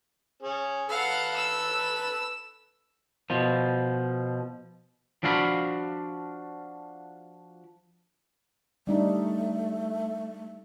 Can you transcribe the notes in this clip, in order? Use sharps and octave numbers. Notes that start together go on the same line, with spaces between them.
C#4 G#4
A4 B4 F5 F#5
E6
B2 F3
F3 D4 F#4 F5 F#5 B5
G3 A3 D4 D#4